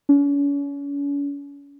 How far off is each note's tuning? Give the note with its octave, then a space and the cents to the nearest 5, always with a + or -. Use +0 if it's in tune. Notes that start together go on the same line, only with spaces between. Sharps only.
C#4 +40